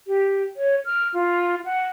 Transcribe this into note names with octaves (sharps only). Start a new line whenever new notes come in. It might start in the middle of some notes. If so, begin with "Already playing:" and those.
G4
C#5
F6
F4
F#5